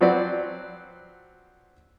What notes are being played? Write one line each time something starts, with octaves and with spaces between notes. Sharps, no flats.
F3 F#3 C4 F#4 B4 D5